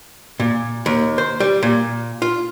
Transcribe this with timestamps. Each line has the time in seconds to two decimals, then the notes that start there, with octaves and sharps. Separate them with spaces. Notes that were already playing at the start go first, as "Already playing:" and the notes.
0.40 A#2
0.86 D#2
1.18 C5
1.40 G3
1.63 A#2
2.22 F4